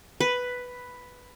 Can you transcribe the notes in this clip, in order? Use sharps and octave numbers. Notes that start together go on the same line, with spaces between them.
B4